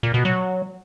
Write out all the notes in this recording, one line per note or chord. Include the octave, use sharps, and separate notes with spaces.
A#2
B2
F#3